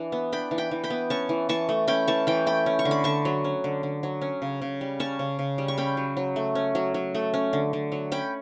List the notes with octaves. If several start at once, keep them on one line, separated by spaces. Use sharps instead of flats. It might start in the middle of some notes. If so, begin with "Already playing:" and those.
Already playing: E3 D4
B3
D4 G5 B5
E3
G5 B5
E3
G5 B5
B3
C#4 A5 C#6
E3
E3 A5 C#6
A3
C#4 G5 B5
E3 A5 C#6
E3 G5 B5
A3 G5 B5
C#4
C#6
D3
B5
D3 A5 C#6
F#3
C#4
D3
D3
F#3
C#4
C#3
C#3
G3
C#4 A5 C#6
C#3
C#3
G3
C#6
C#4 G5 B5
F#3
F#3
A3
C#4
F#3
F#3
A3
C#4
D3
D3
F#3
C#4 G5 B5